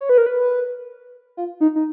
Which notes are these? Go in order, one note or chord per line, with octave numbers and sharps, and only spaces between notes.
C#5
B4
A#4
B4
F4
D#4
D#4